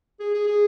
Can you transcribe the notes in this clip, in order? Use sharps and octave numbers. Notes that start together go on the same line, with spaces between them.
G#4
G#4
G#4